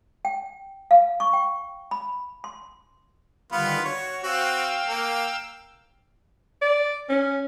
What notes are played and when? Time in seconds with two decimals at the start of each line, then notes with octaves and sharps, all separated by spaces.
0.25 G5
0.91 F5
1.20 C#6
1.33 G5
1.91 B5
2.44 C6
3.52 D3 D#3 G3 B3 F4 B4
3.85 F#4 C#5
4.24 C4 F#4 F5 G5 E6
4.87 A#3
6.62 D5
7.09 C#4